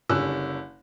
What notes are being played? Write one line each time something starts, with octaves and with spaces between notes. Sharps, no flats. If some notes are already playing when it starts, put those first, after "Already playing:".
F#1 D3 G3 C#4 E6 F#6